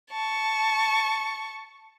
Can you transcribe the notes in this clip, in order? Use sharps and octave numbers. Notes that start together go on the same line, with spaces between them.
A5 C#6